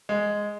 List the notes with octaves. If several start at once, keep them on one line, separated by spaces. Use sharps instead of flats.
G#3